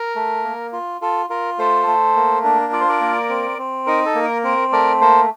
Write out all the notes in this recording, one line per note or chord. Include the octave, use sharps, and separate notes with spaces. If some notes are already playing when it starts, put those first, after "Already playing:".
Already playing: A#4
A3
A#3
F4
F4 A4
F4 A#4
A3 A4 C5
A3
A#3
D4
F4 D5
C5
A#4 D5
A#3
C4
C4
D#4 A#4
A4
A#3
A#4
C4 A#4
A3 A#4 D5
A#3 A4 C5